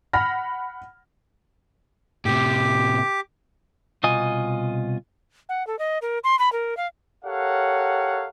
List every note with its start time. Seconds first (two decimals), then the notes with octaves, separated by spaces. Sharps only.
0.13 F#5 B5 F6 A#6
2.25 A2 C3 G4 D6
4.03 C2 B2 F4 D#5 G#5
5.49 F#5
5.67 A4
5.79 D#5
6.02 A#4
6.24 C6
6.39 B5
6.52 A#4
6.77 F5
7.24 G4 A4 A#4 C#5 F5 F#5